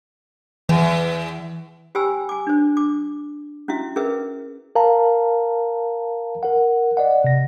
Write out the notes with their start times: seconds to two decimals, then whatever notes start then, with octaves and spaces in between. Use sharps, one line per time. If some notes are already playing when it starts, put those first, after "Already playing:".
0.69 E2 E3
1.95 G4 C5 G5 G#5 B5 E6
2.29 G#5 D6
2.47 D4 C5
2.77 D6
3.68 C#4 E4 F#4 E5
3.96 C#4 G#4 A#4 B4 E5
4.75 A#4 F5 A5 A#5
6.43 A#4 F#5
6.97 D5 D#5 F#5
7.24 C3 A#6